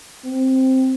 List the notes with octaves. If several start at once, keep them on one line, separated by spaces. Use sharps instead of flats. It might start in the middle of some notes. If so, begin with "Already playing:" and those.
C4